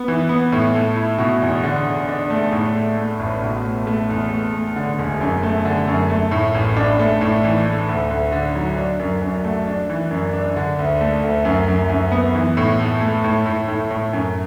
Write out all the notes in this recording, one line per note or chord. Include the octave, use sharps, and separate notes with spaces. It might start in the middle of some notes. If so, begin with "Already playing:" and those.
Already playing: B3
E3
B3
A2
A3
E4
B2
E2
D3
D3
D4
A3
A2
A3
A3
A1
B2
A3
A3
E2
A3
A3
D3
E1
F#2
A3
D3
F#2
A3
A2
A1
D4
A3
A2
E3
A3
D2
D2
D3
F#3
D4
F#2
F#2
A3
D4
E3
F#2
D4
D3
D2
A3
D2
F#2
F#2
F#2
B3
E3
A2
A3
A3
A2
A2
A2
A2
F#2